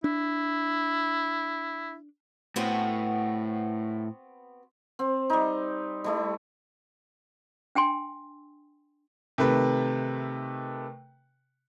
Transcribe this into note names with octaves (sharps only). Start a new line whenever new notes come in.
D4 E4
A2 B3 C4 F#4
C4
G3 D#4
G3 A3 E4
D4 G5 G#5 C6
C3 D#3 A3 B4